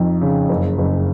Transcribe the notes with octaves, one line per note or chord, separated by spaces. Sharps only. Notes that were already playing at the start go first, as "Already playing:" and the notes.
Already playing: F2 D#4
C#3
F#1
F#1